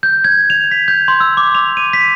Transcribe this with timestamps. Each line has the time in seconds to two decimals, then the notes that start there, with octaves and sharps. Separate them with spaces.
0.03 G6
0.24 G#6
0.50 F7
0.71 B6
0.88 G6
1.08 C6
1.20 E6
1.37 D6
1.55 F7
1.77 D#7
1.93 B6